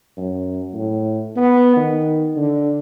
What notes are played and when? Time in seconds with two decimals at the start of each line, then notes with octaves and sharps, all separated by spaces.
0.18 F#2
0.73 A2
1.37 B3
1.76 D#3
2.36 D3